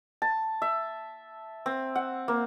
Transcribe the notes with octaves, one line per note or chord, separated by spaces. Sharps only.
A5
E5
C4
F#5
A#3